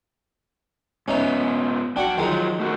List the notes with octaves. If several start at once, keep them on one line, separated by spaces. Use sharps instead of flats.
G#2 B3 C#4 D#4 E5
F#2 D4 F#4 F#5 G5
D#3 F3 F#3 G#3 D#4
A3 F#4 A#4